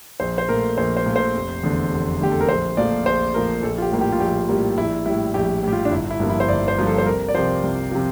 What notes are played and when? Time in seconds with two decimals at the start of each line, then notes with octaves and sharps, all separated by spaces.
0.20 A#1 C5
0.38 C5
0.49 A#2 A3 A#4
0.78 A#1 C5
0.97 C5
1.06 A#2 A3
1.16 C5
1.35 F1
1.63 E2 D3 A3
1.92 F1
2.20 E2 D3 A3 G4
2.32 A4
2.40 A#4
2.49 A#1 C5
2.77 A#2 F3 A3 D5
3.06 A#1 C5
3.34 A#2 F3 A3 A#4
3.63 A#1 A4
3.78 F4
3.82 G4
3.92 A2 G3 A#3
4.01 G4
4.12 F4
4.20 A#1 G4
4.49 A2 G3 A#3
4.77 A#1 E4
5.06 G3 E4
5.10 A2
5.34 A#1 G4
5.63 A2 G3 G4
5.73 F4
5.85 D4
5.91 G1 E4
6.11 E4
6.20 G2 F3 A#3
6.30 E4
6.40 C5
6.49 G1 D5
6.68 C5
6.78 G2 F3 A#3
6.87 A4
6.98 C5
7.06 C2 A#4
7.28 D5
7.34 C3 F3 C5
7.63 C2
7.92 C3 F3